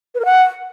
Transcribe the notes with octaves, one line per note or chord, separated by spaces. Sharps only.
B4
A#4
F#5